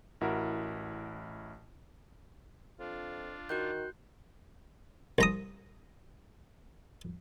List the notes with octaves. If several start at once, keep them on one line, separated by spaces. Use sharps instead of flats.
A1 E4 F#4 A#4
F2 D4 F4
D#3 F#4 F#6 G6
C2 A#5 D#6